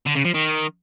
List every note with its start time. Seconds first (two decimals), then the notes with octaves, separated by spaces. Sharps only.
0.06 D3
0.15 C#3
0.25 F3
0.34 D#3